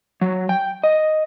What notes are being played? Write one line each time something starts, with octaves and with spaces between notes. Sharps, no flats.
F#3
G5
D#5